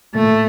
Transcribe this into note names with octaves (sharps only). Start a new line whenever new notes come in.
A#2 A3
A2
A#2